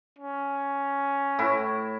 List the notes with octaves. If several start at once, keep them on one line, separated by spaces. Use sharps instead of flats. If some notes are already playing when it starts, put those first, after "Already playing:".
C#4
A2 E4 C#6